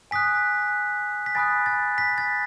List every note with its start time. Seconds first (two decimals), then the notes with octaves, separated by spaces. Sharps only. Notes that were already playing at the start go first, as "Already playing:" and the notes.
0.11 G#5 D#6 F#6 B6
1.26 B6
1.35 G#5 B5 D#6 F#6 A6
1.66 A6
1.98 B6
2.18 A6